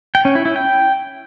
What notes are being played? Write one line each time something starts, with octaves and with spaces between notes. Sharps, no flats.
G5
C#4
E4
E4
G5